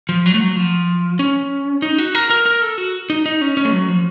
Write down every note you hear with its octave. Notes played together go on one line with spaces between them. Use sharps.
F3
F#3
A3
F#3
F3
C#4
D#4
F#4
A#4
A#4
A#4
A4
F#4
D#4
D#4
C#4
C#4
A3
F#3
F3